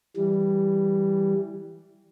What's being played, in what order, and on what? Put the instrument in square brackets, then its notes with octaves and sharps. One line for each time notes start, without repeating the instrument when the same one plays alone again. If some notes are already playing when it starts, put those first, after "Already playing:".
[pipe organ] E3 G3